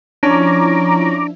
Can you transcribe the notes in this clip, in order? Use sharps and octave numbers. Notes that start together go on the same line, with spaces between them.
F3 C#4 D4 E4 A#5 D6